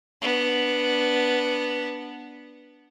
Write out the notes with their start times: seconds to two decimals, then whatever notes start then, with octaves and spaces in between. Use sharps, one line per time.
0.22 B3 D4